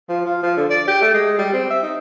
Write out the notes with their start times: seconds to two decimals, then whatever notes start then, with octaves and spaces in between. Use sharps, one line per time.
0.09 F3
0.26 F4
0.43 F3
0.57 D3
0.70 D5
0.88 G4
1.02 A3
1.14 G#3
1.39 G3
1.53 C4
1.70 E5
1.83 D#4